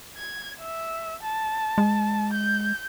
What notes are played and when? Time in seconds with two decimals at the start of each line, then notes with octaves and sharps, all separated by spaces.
0.17 G#6
0.60 E5
1.23 A5
1.78 G#3
2.33 G6